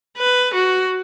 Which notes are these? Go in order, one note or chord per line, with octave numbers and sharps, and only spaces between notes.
B4
F#4